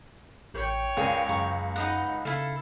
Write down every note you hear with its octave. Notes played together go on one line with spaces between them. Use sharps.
A1 C#5 G5
C#2 G#4 A#4 D5
F#2 G#4 A#5 C#6
D#4 B4 D#5 F#5
C#3 E4 A4 F5